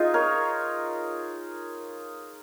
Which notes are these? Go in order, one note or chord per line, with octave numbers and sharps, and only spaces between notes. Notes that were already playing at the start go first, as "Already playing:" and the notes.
Already playing: D#4 F4 G#4
A#4 C#5